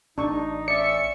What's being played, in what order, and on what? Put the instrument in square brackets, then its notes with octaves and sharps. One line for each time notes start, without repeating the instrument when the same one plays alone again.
[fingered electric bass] A1 [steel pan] D4 C#6 [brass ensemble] D#4
[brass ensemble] C#4 A4 E5 [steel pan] D5 [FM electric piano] C#7